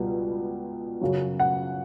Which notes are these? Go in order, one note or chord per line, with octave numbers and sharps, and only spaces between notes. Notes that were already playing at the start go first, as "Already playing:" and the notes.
Already playing: C#2 B2 G3
F#2 C#3 F#3
F#5